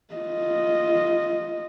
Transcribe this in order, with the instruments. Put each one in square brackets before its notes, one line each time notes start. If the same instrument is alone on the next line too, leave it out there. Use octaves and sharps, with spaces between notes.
[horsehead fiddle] F4 D#5